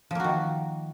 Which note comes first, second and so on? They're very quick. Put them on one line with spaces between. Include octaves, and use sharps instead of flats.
F3 A#3 F#4 D#3